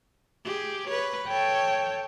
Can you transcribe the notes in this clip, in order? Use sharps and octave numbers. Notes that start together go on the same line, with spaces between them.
G4 G#4
B4 C#5
A4 C#5 G5